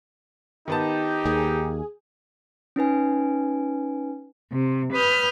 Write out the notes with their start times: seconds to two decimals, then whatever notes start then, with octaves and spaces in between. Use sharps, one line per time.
0.68 D#3 B3 D#4 G4 A5
1.25 D#2 G#4
2.76 C#4 D#4 B4 G#5
4.52 C3
4.93 B4 D#6 F6 G6